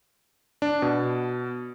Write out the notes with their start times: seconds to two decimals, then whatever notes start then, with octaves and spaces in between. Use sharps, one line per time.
0.62 D4
0.82 B2